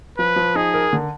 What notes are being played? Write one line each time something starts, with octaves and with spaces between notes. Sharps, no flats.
F3 B4
F3
D#4 G#4
A#4
D3